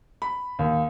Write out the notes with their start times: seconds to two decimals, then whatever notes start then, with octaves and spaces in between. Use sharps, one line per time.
0.22 B5
0.59 D#2